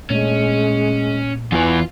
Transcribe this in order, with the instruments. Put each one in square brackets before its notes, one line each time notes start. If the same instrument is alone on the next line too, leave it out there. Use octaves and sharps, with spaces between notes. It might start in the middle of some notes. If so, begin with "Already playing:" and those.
[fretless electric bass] A#2 A3 D4 [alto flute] G#3 [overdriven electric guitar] C#4
[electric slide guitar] E2 E3 [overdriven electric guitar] F4 [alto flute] G#5